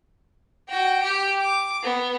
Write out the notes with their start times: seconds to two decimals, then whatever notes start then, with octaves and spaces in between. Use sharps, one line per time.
0.69 F#4 G5
1.03 G4
1.41 D6
1.84 B3